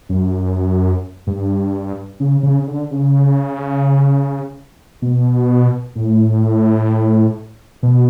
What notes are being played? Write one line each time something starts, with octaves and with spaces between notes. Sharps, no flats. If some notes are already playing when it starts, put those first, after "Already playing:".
F#2
G2
C#3
C#3
D3
C#3
B2
A2
B2